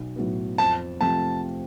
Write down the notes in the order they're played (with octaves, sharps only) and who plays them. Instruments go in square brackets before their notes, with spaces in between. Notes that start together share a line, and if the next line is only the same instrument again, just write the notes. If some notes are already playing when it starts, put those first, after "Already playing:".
Already playing: [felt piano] B1
A2 F#3 B3
[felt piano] F2 [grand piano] A5
[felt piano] C3 F3 A3 C4 [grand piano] A5